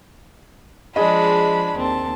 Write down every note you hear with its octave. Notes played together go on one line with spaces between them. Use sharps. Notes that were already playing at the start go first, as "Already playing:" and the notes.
F3 G#3 D4 G#4 D#5 B5
D#2 C4 A5